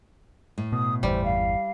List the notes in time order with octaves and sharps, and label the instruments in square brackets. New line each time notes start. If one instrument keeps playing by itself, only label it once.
[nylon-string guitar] A2
[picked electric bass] B2 [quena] D#6
[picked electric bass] G1 E2 E3 [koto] G3 [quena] C5
[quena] F5